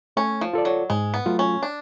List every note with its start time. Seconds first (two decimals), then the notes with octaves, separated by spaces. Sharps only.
0.17 A3 C#4
0.41 F3
0.53 F4 A4 D5
0.65 F#3
0.90 G#2 G#3
1.14 B3
1.26 F#3 A3 F4
1.39 C#4
1.63 D4